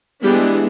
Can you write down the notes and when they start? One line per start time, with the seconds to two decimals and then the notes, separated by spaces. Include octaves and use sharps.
0.23 E3 G3 G#3 B3 D4 G4